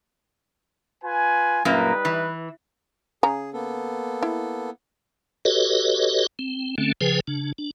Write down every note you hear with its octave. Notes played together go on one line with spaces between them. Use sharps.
F4 B4 G#5
F#2 A#2 G3 A#3 D#4 B4
E3
C#3 G#4 A#5
A#3 B3 A4
E4
F#4 G4 A4 B4 C#5 D#5
C4
D3 A3 C4 C#4
C#3 F3 G#4 B4 G5 G#5
C#3 D4
D4